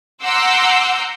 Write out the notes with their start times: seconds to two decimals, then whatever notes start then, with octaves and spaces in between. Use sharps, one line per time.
0.23 F#5 A#5 C6 D6 E6 G6